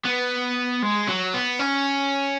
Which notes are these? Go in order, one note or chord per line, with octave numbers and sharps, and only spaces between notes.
B3
G#3
F#3
B3
C#4